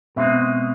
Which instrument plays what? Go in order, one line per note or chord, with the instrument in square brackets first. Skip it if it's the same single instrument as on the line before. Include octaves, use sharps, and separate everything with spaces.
[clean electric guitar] B2 G#3 C4 D#4 [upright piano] E5